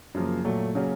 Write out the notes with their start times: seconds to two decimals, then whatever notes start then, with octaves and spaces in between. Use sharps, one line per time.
0.14 F#2 C#3 F3 A#3
0.45 A#2 F#3 A3
0.75 C#3 F#3 A#3 C#4